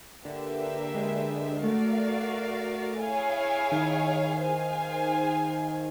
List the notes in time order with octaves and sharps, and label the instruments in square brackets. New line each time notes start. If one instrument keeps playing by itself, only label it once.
[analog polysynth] D3 [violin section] A#3 D4 G4 B4 E5
[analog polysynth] G#3
[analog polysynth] A3 [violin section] F#4 A#4 D5 F5
[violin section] E4 G#4 C#5 F5 G#5
[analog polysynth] D#3
[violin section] G#4 C5 F5 G#5